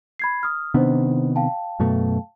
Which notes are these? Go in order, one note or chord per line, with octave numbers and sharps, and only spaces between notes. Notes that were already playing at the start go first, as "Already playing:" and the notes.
B5 G#6 C7
D#6 F6
C3 D#3 B3 D4 C5
F5 G5 A5
F#2 B2 A3